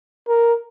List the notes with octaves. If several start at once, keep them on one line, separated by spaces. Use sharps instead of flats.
A#4